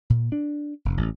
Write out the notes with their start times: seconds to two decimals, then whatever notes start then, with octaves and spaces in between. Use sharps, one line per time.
0.10 A#2
0.32 D4
0.85 F1
0.97 A1